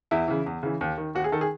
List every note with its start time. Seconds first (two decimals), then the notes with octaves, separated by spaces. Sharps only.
0.11 E2 E4
0.28 C#3 E3
0.46 E2
0.63 C#3 E3
0.81 D#2
0.98 D#3
1.15 D#2 F#4
1.24 G#4
1.32 D#3 A4
1.41 G#4